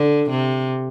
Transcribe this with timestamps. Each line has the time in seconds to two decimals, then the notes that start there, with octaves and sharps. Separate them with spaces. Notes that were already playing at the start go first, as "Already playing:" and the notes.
Already playing: D3
0.31 C3